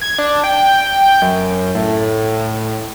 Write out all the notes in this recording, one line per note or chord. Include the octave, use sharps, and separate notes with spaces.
G#6
D4
G5
F#2
A2